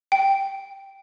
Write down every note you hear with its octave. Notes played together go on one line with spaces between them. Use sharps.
G5